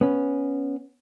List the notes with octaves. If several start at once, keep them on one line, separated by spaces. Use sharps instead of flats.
B3 C#4